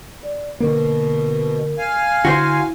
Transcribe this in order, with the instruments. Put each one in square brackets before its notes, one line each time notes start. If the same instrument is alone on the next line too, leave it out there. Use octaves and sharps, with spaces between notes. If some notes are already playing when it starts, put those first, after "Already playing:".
[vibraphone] D5
[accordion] B2 [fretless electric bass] D3 A#3 [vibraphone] A#4
[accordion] F5 G#5
[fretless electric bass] D3 [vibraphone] E4 [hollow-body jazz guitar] F#4 C5